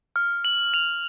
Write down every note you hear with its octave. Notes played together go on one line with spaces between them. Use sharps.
F6
F#7
F7